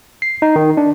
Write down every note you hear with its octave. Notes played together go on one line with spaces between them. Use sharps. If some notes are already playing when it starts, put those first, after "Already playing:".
C7
D#4
D#3
D4